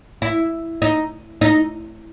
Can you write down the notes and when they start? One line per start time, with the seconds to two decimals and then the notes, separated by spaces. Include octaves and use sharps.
0.22 E4
0.82 D#4
1.41 D#4